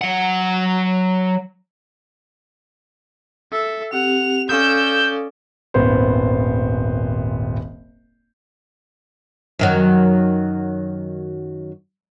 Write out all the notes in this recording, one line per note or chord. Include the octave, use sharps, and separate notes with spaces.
F#3 F#5
A4 E5
C4 G4 F#5 F7
C#4 A4 D5 F5 D#6 E6 G6
D#1 G#1 B3 C5
F#2 D#3 F#3